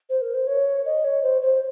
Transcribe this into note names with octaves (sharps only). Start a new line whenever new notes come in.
C5
A#4
C5
C#5
D#5
C#5
C5
C5